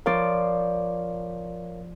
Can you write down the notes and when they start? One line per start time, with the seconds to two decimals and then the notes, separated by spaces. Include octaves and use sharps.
0.06 F3 F4 A#4 C#5 D5 F5